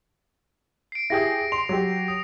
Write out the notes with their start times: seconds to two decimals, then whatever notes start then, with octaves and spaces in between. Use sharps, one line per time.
0.92 C7 D7
1.10 E4 G4 G#4 A#6
1.52 C6 F7
1.69 F#3 G4
2.08 D#6